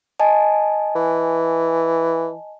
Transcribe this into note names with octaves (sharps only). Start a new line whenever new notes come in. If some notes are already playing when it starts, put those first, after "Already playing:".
D#5 G#5 A5
E3